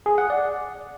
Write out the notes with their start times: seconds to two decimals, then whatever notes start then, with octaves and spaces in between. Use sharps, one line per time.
0.06 G#4
0.18 F#5
0.30 D5